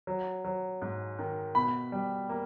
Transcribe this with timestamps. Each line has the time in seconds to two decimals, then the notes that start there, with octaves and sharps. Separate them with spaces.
0.07 F#3
0.44 F#3
0.82 G#2
1.19 D#3
1.55 B2 B5
1.92 G3
2.29 A#3